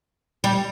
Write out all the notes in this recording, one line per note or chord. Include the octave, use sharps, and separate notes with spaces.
G3